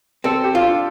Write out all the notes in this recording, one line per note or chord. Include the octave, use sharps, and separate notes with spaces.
C4 A4
G4
F4
D4